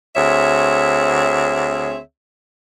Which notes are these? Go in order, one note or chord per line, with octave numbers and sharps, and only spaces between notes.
D2 C4 G#4 C#5 E5